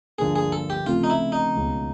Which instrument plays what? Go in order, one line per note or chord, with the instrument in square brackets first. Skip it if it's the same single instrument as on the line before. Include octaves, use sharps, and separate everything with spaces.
[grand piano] G2 D3 F3 A#3 [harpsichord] G#4
[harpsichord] G#4
A4
G4
[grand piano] C#3 F3 A3 C4 [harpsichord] F4
[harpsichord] D#4
E4
D#4
[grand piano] C#2 B2 G#3 C#4